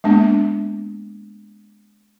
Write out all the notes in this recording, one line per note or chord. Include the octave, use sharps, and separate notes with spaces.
G#3 A#3 B3 D4